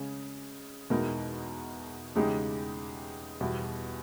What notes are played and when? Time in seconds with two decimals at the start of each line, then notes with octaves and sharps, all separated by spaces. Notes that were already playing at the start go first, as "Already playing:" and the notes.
Already playing: C#3 G#3 C#4 G#4
0.90 E2 B2 G#3 D#4 A#4
2.15 E2 C#3 G#3 D#4 G4
3.41 E2 B2 G3